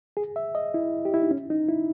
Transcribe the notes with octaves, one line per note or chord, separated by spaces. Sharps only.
G#4
E5
D#5
E4
G4
E4
D#4
C#4
D#4
E4